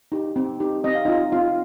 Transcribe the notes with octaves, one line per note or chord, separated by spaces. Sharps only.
D#4 G4
C4
D#4 G4
C4 D#5
F5
D#4 F4 D#5
C4 F4 F5